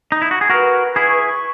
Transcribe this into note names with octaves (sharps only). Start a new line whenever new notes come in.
D#4
E4
F#4
G#4
F#4 A#4 B4
E4 G#4 C#6